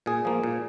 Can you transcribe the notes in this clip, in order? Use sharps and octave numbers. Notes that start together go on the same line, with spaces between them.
A#2 G#4
F3 A#3
A#2